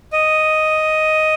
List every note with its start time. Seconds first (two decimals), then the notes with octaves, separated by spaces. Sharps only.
0.13 D#5